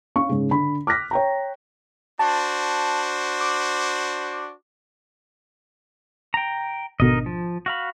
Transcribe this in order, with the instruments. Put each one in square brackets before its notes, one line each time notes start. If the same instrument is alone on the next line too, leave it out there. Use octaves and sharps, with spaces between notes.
[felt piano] C#4 F5 C#6
G#2 C#3
D3 B5
D6 F6 F#6 A#6 B6
C#5 G5 A#5
[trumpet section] D4 F#4 C5 [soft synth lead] A5
[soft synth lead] D6
[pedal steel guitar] G5 A#5
[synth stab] G#1 B2 D3 [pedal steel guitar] D#4 A#4 D#5
[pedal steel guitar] F3
F#4 F5 B5